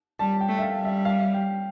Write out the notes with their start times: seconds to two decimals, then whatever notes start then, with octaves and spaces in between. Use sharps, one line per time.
0.19 G3 A5
0.41 G5
0.48 A3
0.58 E5
0.62 F5
0.77 G3
0.85 E5
1.05 F5
1.34 G5